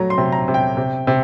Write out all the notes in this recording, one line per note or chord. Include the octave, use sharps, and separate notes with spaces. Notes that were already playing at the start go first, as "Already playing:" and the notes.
Already playing: F#3 A3 A#5
C6
C3
A#5
C3
G5
C3
C3